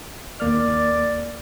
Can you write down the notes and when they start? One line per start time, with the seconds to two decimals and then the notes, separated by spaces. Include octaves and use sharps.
0.40 D#2 A#3 D5 F6